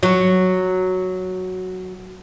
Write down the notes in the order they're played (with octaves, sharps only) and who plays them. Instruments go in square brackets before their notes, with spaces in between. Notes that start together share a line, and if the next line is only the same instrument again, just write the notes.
[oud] F#3 F#4